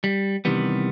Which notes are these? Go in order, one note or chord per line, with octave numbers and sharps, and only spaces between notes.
G3
C3 D#3 E3 G3 B3